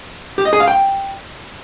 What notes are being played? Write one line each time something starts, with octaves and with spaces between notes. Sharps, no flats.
G4
D#5
G#4
F5
G5